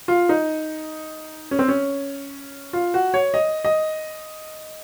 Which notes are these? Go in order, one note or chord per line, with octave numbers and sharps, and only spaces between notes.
F4
D#4
C#4
C4
C#4
F4
F#4
C#5
D#5
D#5